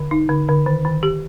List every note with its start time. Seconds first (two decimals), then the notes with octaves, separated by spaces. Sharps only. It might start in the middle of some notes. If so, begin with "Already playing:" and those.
Already playing: D3
0.11 D#4
0.29 D3
0.48 D3
0.66 D#3
0.85 D#3
1.03 G4